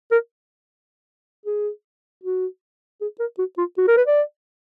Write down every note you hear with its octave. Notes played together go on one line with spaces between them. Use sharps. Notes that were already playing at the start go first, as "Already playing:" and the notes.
A#4
G#4
F#4
G#4
A#4
F#4
F4
F#4
A#4
B4
D5